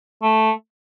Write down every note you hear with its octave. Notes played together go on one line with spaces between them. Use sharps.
A3